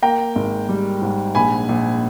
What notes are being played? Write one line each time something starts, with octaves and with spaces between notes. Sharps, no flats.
A#3 G5 A#5
G#1
G3
G#2
A#1 G#5 B5
A#1